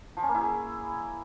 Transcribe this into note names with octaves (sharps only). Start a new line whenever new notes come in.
F3
C#4
A#3
E4
G#4